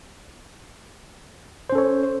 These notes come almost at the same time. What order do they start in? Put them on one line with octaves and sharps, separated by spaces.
C5 C#4 A4 C#5